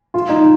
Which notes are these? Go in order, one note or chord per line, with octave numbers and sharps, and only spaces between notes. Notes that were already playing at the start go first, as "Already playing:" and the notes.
F4
D#4